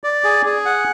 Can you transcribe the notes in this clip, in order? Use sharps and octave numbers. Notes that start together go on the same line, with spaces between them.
D5
G#4
G#4
F#5